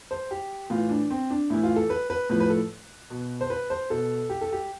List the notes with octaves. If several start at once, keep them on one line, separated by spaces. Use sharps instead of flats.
C5
G4
A2 E3 F4
D4
C4
D4
A2 E3 E4
F4
A4
B4
B4
A2 F3 B4
B4
A4
B2
C5
B4
C5
B2 A4
G4
A4
G4